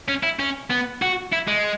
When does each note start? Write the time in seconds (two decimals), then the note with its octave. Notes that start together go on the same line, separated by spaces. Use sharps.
0.08 C#4
0.23 E4
0.39 C#4
0.70 B3
1.02 F#4
1.33 E4
1.48 G#3